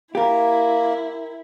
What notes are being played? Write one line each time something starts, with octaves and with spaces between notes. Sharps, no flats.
A#3 E4 G4 A#4